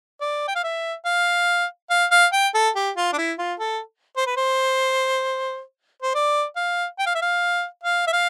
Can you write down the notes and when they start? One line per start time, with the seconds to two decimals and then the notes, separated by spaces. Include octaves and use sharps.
0.21 D5
0.48 G5
0.55 F5
0.64 E5
1.05 F5
1.90 F5
2.11 F5
2.33 G5
2.54 A4
2.76 G4
2.97 F4
3.13 D4
3.18 E4
3.39 F4
3.60 A4
4.17 C5
4.27 B4
4.37 C5
6.02 C5
6.15 D5
6.56 F5
6.99 G5
7.06 F5
7.15 E5
7.22 F5
7.84 F5
8.07 E5
8.13 F5